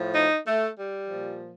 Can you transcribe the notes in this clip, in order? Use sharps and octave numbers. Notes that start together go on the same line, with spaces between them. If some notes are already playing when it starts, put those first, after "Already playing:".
Already playing: A2 F3
D#4
A3
G3
A#2 F3